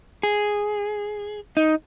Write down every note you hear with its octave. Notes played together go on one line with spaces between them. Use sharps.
G#4
D#4